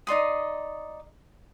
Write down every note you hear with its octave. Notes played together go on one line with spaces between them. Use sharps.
D#4 D5 C6 D#6